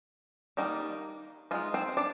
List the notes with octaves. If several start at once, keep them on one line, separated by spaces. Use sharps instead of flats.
D#3 G3 A#3 D4 D#4
G#3 D#4 F4
C4 C5
D4 D5